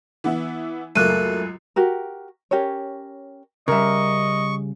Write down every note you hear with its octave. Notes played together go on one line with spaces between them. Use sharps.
E3 B3 E4
C#2 F#2 A3 A#3 F#6 D#7
F#4 G4 A#4
C#4 G4 A#4 C#5
C#3 G3 A#4 D#5 E5 C#6